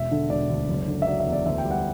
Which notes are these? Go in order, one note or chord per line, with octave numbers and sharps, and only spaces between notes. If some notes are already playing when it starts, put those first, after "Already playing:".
Already playing: E1 E5
D3
E1 D5
D2
F#1
D3
E5
F#3 D5
E5
E2
D5
D2 E5
G5
G3
F#5